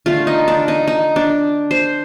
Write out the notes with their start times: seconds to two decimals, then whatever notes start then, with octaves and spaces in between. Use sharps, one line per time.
0.06 D3 A3 F4
0.27 D#4
0.48 D4
0.68 D#4
0.87 D#4
1.16 D4
1.71 C5